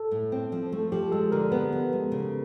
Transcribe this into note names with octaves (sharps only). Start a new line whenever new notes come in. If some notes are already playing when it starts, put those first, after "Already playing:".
Already playing: A4
A2
C4
F3
A3
F3 G4
G#3 A4
D3 A#4
B3 B4
F3
G#3
C#3